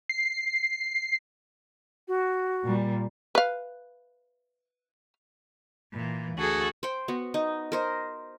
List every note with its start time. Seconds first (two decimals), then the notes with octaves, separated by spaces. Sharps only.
0.09 C7
2.08 F#4
2.64 A#2 G3
3.35 B4 F5
5.93 A#2 E3
6.38 D2 F#4 G#4 A4
6.83 C5 G5
7.08 B3 F#4
7.34 D#4
7.72 A#4 C5 D#5